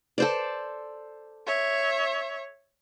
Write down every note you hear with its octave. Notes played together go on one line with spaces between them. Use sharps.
A4 C5 D5
C#5 E5